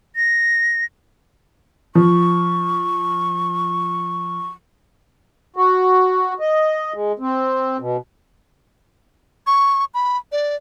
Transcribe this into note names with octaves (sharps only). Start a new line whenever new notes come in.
A#6
F3 C#6
F#4
D#5
G#3
C4
B2
C#6
B5
D5